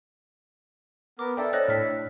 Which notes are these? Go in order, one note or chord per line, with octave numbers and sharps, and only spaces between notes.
B3 A#4 D6
D4 A4 D5 E5 G5
C5 C#5 D#5 F#6 A#6
A2 F6 B6